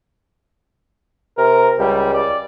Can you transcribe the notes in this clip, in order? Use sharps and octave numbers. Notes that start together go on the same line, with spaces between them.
C3 A#4
C#2 G3
D5